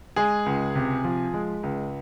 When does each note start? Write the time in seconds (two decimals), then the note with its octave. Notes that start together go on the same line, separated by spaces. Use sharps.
0.16 G#3 G#4
0.46 C#2
0.75 C3
1.04 F3
1.34 G#3
1.63 C#2